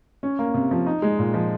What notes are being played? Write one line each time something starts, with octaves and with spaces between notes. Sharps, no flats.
C#4
A#3
C3
F3
D#4
G#3
A#2
F3